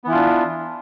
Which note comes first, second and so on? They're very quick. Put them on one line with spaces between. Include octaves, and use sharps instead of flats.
B3 E3 E4 F4 D4